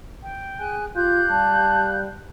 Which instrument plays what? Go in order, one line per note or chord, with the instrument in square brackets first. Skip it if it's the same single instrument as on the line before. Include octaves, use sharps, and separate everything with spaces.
[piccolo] G5
[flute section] G#4 G#5 F#6
[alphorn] F4 [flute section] G4 F5 G6 [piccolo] F#6
[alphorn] G3 [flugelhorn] A5